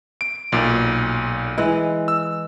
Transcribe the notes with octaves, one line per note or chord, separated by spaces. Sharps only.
D7
B1 A#2
E3 G#3 E4
E6